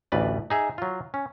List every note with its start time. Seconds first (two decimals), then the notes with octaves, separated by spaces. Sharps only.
0.12 A1 D2 B4 D5
0.50 D#4 G#4 E5
0.78 F#3 F4
1.14 C#4